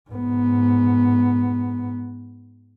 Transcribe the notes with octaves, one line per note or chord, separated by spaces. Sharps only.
G#2 B3